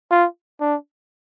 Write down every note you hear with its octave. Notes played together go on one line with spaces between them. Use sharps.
F4
D4